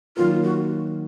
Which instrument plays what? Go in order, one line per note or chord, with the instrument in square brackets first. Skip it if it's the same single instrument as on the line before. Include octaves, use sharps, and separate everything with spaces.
[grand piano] D#3 F#3 A#3 [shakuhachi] F4
[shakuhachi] F#4